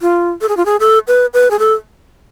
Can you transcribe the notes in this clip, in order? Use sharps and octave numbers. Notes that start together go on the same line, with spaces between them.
F4
A4
G#4
F4
G#4
A4
B4
B4
G#4
A4